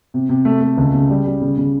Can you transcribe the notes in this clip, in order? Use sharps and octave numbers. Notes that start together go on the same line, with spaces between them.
C3
C3
A3
A3
C#2
C#3
G3
G3
C#3
C#3